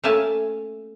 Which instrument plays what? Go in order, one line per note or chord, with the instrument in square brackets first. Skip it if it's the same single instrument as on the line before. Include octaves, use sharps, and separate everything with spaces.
[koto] A3 A#3 C#4 E5 G#5 A5